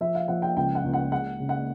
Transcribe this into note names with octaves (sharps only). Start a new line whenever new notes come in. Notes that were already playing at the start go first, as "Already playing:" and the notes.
F3 E5
F5
F3 F#5
G5
C#2 G5
F#5
C#2
F#5
G#3 F#5
C#3
F#5